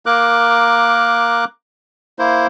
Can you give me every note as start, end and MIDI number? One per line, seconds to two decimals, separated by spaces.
0.06 1.45 58
0.06 1.45 70
0.06 1.45 86
0.06 1.45 90
2.19 2.47 58
2.19 2.47 64
2.19 2.47 72